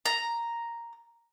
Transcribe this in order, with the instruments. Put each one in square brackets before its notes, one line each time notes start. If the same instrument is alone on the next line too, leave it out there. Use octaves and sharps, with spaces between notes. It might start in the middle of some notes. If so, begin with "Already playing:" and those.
[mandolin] A#5